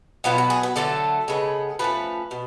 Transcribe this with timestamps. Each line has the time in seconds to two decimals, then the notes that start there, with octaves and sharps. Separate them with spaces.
0.24 B2 F#3 B3 F4
0.38 F#4
0.50 G#4
0.63 B4
0.76 D3 F#3 A3 A4
1.28 C#3 G#3 B3
1.79 F3 A3 C#4 B4
2.31 B2